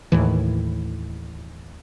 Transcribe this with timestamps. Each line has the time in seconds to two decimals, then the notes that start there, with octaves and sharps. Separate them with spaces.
0.12 D#2 A2 E3